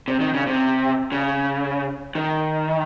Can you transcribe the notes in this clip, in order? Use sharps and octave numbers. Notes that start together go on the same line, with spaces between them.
C3
D#3
C#3
C3
C#3
D#3